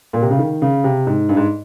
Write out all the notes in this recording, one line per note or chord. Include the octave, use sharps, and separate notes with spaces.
A#2
C3
C#3
D#3
C#3
C3
G#2
G2
G#2